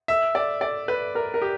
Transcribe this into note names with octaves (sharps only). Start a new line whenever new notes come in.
E5
D5
D5
B4
A#4
A#4
G4